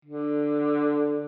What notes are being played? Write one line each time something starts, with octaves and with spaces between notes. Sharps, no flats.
D3